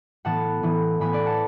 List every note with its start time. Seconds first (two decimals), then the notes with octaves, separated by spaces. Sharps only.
0.25 A2 E3 B3 F#5 A5
0.63 A2 E3 B3
1.00 A2 E3 B3 G#5 B5
1.13 B4 D5
1.26 F#5 A5